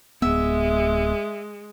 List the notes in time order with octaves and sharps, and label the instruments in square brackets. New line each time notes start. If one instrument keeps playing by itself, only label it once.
[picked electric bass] D1 B3 [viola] G#3 [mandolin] E5